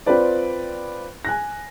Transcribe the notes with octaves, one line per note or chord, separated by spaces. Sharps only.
C4 F4 B4 D5
G#5 F#6 A#6